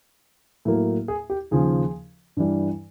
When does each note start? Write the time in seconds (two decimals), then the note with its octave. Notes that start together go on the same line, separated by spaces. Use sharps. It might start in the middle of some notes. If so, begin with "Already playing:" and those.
0.65 A2 F#3 A#3
1.08 G#4
1.30 G4
1.51 D#2 C#3 F3 G#4
2.37 G2 E3 G3